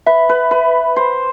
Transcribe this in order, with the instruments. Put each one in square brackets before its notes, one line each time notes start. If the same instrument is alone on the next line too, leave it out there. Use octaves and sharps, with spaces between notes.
[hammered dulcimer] B4 [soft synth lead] E5
[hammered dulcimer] B4
B4
C5